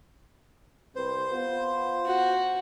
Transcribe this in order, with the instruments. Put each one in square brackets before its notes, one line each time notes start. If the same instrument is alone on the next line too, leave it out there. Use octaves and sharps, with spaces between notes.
[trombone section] C2 C4 B4 [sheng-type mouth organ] C5
[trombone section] B3 F4
[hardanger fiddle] F#4